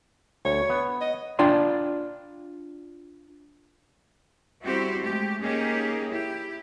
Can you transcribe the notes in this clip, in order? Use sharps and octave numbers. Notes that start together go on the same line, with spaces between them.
D2 C#5
B3
D#5
D4 F4 D5 G5 C6
G3 C4 E4 F#4 G4 C5
G#3 A3 G4
A#3 C#4 D#4 G4 G#4
E4 G4